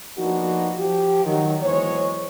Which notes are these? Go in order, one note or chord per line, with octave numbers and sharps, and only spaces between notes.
F3 A#3 B3 D4 D#4 F#4
F3 G4
D#3 F#3
E2 A#2 F#3 G#3 C5 C#5